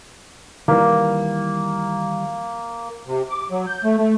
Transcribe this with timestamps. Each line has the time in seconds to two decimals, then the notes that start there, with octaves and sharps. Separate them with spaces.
0.68 D#3 E3 G3 A#3
3.07 C3
3.30 D6
3.51 F#3
3.67 G6
3.84 A3
3.98 A3